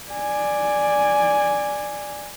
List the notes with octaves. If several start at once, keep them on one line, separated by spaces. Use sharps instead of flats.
D5 G#5